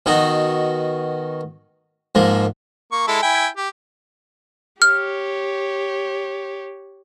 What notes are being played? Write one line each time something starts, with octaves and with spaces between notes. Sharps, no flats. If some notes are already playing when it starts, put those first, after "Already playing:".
B2 D#3 D#4 F#4
G#2 F3 A#3
A#3 C#6
G#3 E4 A4
E4 G5 G#5
G4
G4 C#5 F6